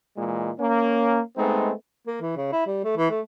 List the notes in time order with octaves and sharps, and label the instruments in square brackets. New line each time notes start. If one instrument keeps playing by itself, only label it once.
[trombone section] A#2 E3 G#3
A#3 C#4
G#3 A3 B3 C4 D#4
[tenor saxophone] A#3
E3
C#3
E4
G3
A3
E3
A3